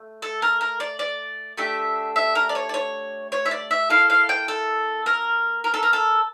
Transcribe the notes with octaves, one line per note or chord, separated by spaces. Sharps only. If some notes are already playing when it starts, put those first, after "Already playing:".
Already playing: A3
A4
A#4
A#4
D5
D5
A3 D4 G4 E5
E5
A#4
D5
C#5
D5
C#5
C#5
E5
D5
E5
A#3 E4 A4 F5
F5
G5
A4
A#4
A#4
A4
A#4
A4